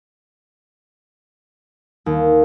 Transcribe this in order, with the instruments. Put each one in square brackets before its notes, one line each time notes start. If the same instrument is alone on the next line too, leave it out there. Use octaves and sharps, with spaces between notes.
[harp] D#2